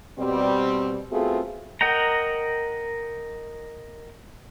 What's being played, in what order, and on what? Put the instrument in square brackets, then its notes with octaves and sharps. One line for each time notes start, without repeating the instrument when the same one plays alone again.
[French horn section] B2 G3 C4
A3 B3 C4 F4 F#4 G#4
[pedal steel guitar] A#4 D#5 F#5 G5 A#5